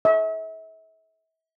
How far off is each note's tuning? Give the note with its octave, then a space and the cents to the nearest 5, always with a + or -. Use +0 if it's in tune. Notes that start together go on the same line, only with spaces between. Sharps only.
E5 -40